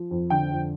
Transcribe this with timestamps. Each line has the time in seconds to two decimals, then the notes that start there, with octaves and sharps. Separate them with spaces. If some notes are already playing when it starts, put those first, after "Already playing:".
Already playing: F3
0.11 F2
0.30 D3 G5
0.51 F2